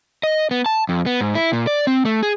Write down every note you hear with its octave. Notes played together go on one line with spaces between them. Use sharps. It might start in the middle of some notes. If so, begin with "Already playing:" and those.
D#5
B3
A5
F2
B3
G#2
E4
A#2
D5
C4
A3
G#4